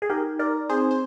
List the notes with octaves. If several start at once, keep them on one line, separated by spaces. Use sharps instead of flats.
G#4
D#4 G4 A#4
D#4 A#4 D5
C4 G#4 C5
C5